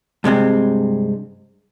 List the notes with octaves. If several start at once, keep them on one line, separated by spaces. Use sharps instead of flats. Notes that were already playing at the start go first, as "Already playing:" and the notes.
G2 C3 G#3 C4